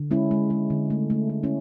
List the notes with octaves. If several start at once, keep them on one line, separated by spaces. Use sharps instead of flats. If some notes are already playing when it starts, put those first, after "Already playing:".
Already playing: D3
G#3 C#4 E4
G#3
G#3
D3
A3
A3
A3
C#4 E4